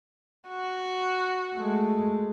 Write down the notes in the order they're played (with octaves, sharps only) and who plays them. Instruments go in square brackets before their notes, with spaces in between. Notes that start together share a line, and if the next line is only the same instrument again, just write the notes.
[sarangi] F#4
[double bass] G#3 A3